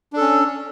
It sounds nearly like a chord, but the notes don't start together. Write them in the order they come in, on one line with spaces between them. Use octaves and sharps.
D4 A4 C#4